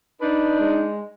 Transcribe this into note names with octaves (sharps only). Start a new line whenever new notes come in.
D4 D#4 B4
G#3